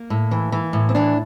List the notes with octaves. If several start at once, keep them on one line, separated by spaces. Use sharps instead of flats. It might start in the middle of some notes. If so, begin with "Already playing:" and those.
Already playing: A#3
A2
E3
E3
A2
C4
E3 D4